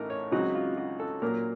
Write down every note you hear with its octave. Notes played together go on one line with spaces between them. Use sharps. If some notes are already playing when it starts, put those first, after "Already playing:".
Already playing: A1 A2 A3 D#4 A#4
C#5
C#2 C#3 F#3 C4 D#4 F#4
F4
F#4
A4
A#2 F#3 A#3 A#4